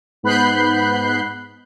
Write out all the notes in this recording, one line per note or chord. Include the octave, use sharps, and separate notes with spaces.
G#2 B3 B5 F#6 G6 C7